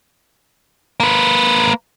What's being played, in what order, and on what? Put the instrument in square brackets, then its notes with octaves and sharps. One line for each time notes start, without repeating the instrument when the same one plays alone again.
[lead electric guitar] A#3 B4